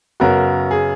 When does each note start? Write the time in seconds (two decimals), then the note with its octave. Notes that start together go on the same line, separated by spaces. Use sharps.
0.20 F#2 C#3 F#3 B3 F#4 A#4
0.71 G#4